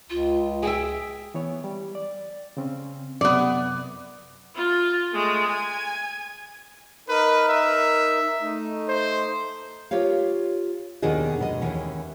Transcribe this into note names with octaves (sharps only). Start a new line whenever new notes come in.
C#2 F4
G#4 E5 G5
E3 B3 C#5
G3
D5
C#3 C4 C#4
F#2 C3 F#3 B3 D5
F4
G#3 A3
G#5
D#4 A#4 B4
E5
A3 D#4
C5
F4 G4 A#4 C#5 F5
D#2 B2 D#3 D4 G#4 D#5
B2 G#3 D#5
D#2 E3 C#4